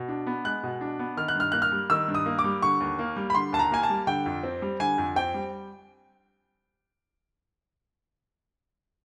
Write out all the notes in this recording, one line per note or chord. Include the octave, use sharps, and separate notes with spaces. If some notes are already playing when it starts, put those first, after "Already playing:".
Already playing: B2
D4
B3
G#3 F#6
B2
D4
B3
D#3 F6
F#6
G2 F6
A#3 F#6
F6
G3
D#3 E6
G2
D#6
A#3
D6
G3
D3 C#6
D#2
A#3
G3
B5
D3 C6
D#2 A5
A#5
A#3 G#5
A5
G3
D3 G5
F2
C4
G3
D3 G#5
F2
C4 G5
G3